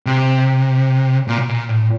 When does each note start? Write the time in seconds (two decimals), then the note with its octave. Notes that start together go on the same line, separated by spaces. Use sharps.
0.06 C3
1.28 A#2
1.38 B2
1.48 A#2
1.69 A2